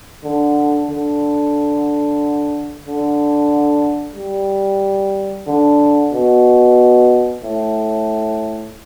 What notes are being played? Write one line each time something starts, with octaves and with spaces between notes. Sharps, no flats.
D3
D3
D3
G3
D3
B2
A2